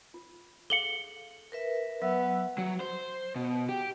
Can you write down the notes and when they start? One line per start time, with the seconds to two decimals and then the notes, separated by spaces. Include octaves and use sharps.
0.14 F4
0.70 G#4 A4 F5 C#7 F#7 G7
1.52 A#4 B4 E5
2.02 F#3 B3 E5 E6
2.58 F#3
2.80 C5
3.36 B2
3.69 G4